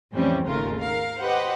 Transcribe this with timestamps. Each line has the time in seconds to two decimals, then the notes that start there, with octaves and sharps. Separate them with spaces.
0.13 F2 A2 E3 G3 C4 C#4
0.46 G#1 D#2 C#3 A3 F4 A#4
0.79 A#4 F5
1.22 G4 B4 C5 D#5 F#5